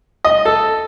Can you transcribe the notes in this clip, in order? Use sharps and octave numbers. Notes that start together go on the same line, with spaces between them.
D#5
A4